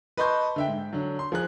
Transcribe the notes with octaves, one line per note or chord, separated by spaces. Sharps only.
B4 D#5 A5 C6 C#6 G6
D3 E5 G5
G#2
D3 F#3
C6
F3 G#4 F#6